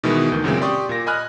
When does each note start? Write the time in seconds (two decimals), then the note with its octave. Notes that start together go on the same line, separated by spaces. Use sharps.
0.03 B2 D#3 E3 G#3 B3
0.32 D2 D#3 G6
0.44 F#2 A#2 C#3 E3 G#3 C4
0.61 G4 D5 C6 C#6 D#6
0.89 A#2 A#3 A#6
1.07 D#5 G#5 B5 F6 F#6